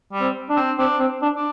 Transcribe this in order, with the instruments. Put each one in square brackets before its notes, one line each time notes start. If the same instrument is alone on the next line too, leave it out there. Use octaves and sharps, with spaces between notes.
[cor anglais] G3
[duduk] C4
D4
[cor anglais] C4
[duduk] C4 [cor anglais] D4
[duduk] C4
D4
[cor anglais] D4